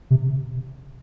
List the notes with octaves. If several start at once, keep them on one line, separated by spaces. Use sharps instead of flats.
C3